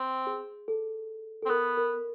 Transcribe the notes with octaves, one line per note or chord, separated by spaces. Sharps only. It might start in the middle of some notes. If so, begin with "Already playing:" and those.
Already playing: C4
G#4
A4
C4 A4
B3 A#4
A#4